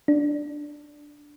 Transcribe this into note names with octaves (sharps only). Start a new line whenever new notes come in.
D4